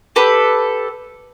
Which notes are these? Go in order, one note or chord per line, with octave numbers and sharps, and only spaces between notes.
G4 A4 B4